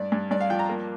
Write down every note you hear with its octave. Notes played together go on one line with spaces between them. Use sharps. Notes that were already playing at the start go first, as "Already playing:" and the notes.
Already playing: G2 D5
G2
G2 D5
F5
F3 G5
A#5
A#3